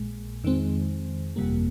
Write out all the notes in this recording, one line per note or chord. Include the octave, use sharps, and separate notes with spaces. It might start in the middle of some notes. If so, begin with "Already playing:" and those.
Already playing: A#1 A#2 G#3
F2 D#3 G#3 C4
G1 F2 C3 G3 A#3